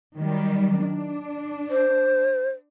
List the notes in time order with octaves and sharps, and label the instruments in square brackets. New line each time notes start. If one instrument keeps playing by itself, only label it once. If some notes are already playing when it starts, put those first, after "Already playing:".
[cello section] D#3 F#3 G3
D4
[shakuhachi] C5